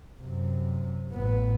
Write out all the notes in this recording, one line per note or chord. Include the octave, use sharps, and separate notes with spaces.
F#2 C3
A1 B3